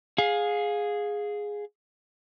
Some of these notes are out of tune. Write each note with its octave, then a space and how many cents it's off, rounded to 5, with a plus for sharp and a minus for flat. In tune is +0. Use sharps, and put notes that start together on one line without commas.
G#4 +0 F5 +25